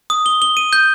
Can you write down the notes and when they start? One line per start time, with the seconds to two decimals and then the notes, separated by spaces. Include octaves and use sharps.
0.10 D#6
0.26 G7
0.42 G7
0.57 D#7
0.73 G6